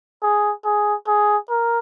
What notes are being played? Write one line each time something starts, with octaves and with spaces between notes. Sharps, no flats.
G#4
G#4
G#4
A#4